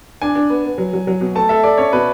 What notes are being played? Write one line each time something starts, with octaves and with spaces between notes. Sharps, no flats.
D4 G#5
D4
B3
B3
F#3
F#3
F#3
B2
A3 A5
A4 E5
A4 D5
C#4 C#5
B2 B4